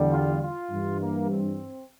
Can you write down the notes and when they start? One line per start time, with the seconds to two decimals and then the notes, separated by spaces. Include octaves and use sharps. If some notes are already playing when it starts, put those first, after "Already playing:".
Already playing: E2 D3 G3
0.12 F4
0.42 F4
0.71 G2 E3 G3
1.01 A#3
1.31 C4